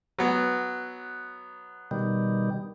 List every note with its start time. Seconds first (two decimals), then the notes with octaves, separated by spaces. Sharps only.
0.19 F#3 B3
1.91 B2 D#3 G3